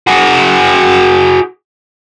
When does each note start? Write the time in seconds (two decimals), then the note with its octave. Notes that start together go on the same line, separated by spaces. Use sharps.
0.07 F#4 G#4